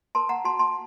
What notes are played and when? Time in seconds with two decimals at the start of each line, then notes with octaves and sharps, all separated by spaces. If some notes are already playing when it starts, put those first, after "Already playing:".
0.15 A#4 A5 C6
0.29 F#5 A#5
0.44 F#4 A5 C6
0.59 A5 C6